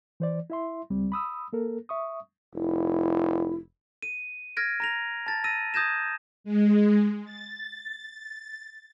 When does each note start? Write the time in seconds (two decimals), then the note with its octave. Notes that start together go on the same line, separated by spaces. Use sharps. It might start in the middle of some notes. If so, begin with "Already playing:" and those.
0.20 E3 C5 D5
0.50 E4 E5 C6
0.90 C#2 G3 C4
1.12 B5 D#6 E6
1.53 A#3 A4 A#4
1.89 E5 C#6 D#6
2.54 F1 E4
4.02 D#7
4.57 F6 G#6 A#6 D7
4.80 A#5 A#6 F7
5.26 A5 A6
5.44 E6 A#6 D#7
5.74 D#6 G6 G#6 A#6 E7
6.44 G#3
7.25 A6